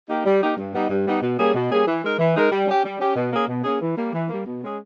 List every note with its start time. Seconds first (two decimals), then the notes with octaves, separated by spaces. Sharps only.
0.09 A#3 D#4 G4
0.25 G3
0.42 A#3 D#4 G4
0.57 G2
0.73 G3 B3 D#4
0.90 G2
1.07 G3 B3 D#4
1.22 B2
1.39 G3 A#3 C#4 G#4
1.55 B2
1.70 G3 A#3 C#4 G#4
1.87 E3
2.02 G#3 D#4 A#4
2.19 E3
2.36 G#3 D#4 A#4
2.51 G3
2.67 C#4 G4
2.84 G3
3.00 C#4 G4
3.16 B2
3.32 A#3 C#4 G#4
3.48 B2
3.64 A#3 C#4 G#4
3.81 E3
3.97 G3 A#3
4.13 E3
4.29 G3 A#3
4.46 B2
4.62 G#3 C#4 G#4